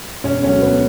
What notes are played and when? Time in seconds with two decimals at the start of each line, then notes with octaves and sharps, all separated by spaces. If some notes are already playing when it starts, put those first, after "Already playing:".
0.24 E1 C#4
0.43 D2 D3 F#3 C#4
0.62 E1 B3